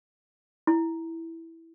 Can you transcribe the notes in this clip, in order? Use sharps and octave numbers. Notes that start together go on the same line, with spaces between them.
E4